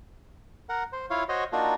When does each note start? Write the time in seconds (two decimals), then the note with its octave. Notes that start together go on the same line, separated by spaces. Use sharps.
0.69 A#4 F#5
0.93 C5
1.10 E4 F4 C#5 F5
1.29 F#4 C5 C#5 D#5
1.52 A#3 D4 D#4 F4 F#4